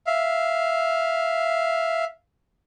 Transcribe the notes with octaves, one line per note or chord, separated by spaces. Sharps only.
E5 F5